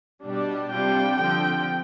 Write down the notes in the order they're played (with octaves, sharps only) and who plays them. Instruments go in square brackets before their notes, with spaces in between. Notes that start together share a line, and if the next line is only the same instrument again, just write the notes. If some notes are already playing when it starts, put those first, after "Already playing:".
[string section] B2 G3 D4 G4
[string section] C3 G3 D4 F4 [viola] G5
[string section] D3 F3 C4 [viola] G5